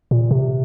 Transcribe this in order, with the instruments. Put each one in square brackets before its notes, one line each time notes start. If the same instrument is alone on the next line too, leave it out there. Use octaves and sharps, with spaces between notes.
[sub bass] A#2
C3